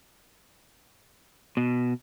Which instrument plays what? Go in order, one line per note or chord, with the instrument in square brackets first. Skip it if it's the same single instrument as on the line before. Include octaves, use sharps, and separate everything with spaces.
[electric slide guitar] B2